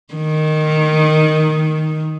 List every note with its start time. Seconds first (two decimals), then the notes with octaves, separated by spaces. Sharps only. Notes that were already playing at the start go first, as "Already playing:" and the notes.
0.14 D#3